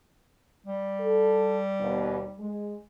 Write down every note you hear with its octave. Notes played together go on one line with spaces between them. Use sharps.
G3
A4
D#2 B2
G#3